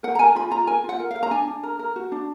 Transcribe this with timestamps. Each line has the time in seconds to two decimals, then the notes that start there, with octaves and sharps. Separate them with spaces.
0.03 A#4 F#5
0.15 A#5
0.19 A#4 G#5
0.35 F4 B5
0.51 F4 A#5
0.67 A#4 G#5
0.84 F4 F#5
1.00 A#4
1.11 A#4 F5
1.23 A#5
1.31 D4 G#5
1.47 D4
1.63 A#4
1.79 A#4
1.96 F#4
2.12 D4